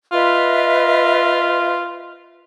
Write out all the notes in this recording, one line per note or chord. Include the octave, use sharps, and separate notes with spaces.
F4 B4 D#5 E5